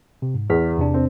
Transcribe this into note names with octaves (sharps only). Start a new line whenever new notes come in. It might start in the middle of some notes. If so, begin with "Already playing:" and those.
C3
G#2
E2 G#4 F6 B6
E2 C3 D4
C4